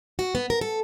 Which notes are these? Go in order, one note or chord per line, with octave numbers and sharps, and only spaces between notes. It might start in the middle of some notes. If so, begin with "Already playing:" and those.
F#4
B3
A#4
A4